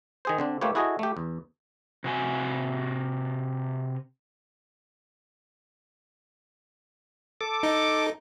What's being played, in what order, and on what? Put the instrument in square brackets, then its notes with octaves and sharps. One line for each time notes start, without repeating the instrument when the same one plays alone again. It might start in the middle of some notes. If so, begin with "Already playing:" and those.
[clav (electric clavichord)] D#3 G#4 C5
D3 C4 D4
A3 A#3 F4 G4 B4 C#5
E4 F#4 G#4 A4 D#5
A3 G4
E2
[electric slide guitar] C3 F#4 G#5
[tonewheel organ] A4 D6
[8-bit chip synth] D#4